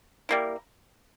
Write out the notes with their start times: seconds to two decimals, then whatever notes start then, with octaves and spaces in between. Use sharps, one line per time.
0.29 G3 A#3 E4